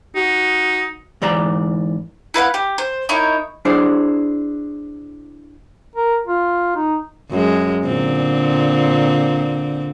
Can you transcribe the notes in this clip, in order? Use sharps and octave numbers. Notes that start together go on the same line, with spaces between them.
D#4 F#4
G#2 E3 D5 A#5
E4 B4 F5 F#5
G4
C5
D#4 E4 A#4 C#5
D4 E4 G#4 C5
A#4
F4
D#4
F#2 G#3
A#2 D3 C4